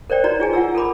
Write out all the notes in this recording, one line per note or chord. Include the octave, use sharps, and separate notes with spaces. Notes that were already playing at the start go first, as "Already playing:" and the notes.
A#4 C5 D5 G5
D#4 F#4 B4 C#5 D5 A#5
F4 G#4 G#5
F4 F#5 A#5 E6
A4 A#4 B5 D6